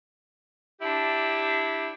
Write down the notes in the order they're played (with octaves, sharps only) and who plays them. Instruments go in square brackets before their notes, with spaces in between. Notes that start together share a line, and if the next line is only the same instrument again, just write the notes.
[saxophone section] D4 E4 G4